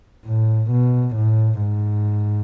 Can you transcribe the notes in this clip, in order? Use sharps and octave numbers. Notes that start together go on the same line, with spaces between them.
A2
B2
A2
G#2